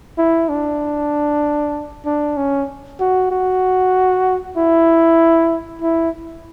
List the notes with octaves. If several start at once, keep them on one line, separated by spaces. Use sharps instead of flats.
E4
D4
D4
C#4
F#4
F#4
E4
E4